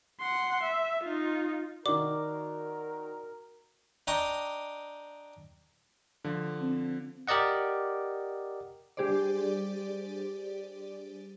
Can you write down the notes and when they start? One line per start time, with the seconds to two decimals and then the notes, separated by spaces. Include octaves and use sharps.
0.21 F#5 C6
0.63 E5
1.04 D#4 F4
1.86 D#3 F#4 A#4 D5 D6
4.07 D4 D#5 G5 A#5 C#6
6.24 D3 F3
6.62 C4
7.28 G4 A#4 D5 D#5 F#5
8.97 G3 D4 G4 G#4 C5 D5